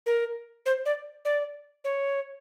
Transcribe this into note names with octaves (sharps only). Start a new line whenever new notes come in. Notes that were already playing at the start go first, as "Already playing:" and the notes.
A#4
C5
D5
D5
C#5